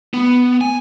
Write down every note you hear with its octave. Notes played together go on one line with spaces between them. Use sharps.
B3
G#5